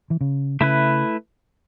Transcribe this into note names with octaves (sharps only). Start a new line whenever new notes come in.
E3
C#3
C#3 A3 E4 B4